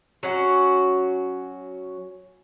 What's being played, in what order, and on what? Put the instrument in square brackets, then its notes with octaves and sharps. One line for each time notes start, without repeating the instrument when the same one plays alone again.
[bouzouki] F#3 C#4 F#4